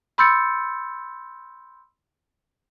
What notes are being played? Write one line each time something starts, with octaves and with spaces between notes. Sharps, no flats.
B5 C6 E6 G6 A6 C#7